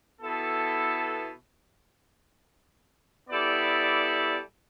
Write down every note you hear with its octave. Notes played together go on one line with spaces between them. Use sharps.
B2 B3 E4 A4
G3 B3 E4 A4 D5